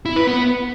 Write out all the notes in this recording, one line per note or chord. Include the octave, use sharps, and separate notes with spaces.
E4
B4
B3